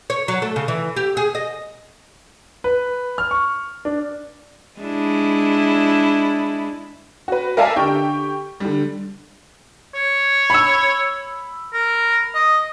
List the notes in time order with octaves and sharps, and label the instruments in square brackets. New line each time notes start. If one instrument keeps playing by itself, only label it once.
[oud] C#5
F#3
A3
C#3
E3
G4
G#4
D#5
[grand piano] B4
F6
C#6
D4
[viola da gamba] G#3 D4 E4
[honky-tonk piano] F#4 B4
A#4 D5 E5 F5 G#5 A5
D3 G4 G5 C#6
D3 G3
[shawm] C#5
[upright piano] B5 E6
[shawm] A#4
D#5